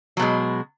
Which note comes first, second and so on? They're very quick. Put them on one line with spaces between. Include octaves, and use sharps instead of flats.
F#3 B2 G#3